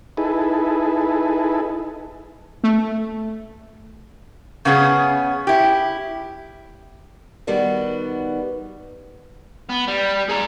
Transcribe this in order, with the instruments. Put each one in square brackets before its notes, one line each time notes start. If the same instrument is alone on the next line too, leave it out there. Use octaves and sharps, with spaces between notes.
[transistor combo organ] D#4 E4 G#4 A4 B4
[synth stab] A3
[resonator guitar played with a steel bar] C#3 B3 C#4 G#4
E4 G4
[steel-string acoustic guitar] D#3 G3 B3 F#4
[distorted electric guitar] B3
G3
G#4 A#5